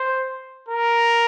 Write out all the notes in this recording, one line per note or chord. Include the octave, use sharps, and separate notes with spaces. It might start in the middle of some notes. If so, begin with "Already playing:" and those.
Already playing: C5
A#4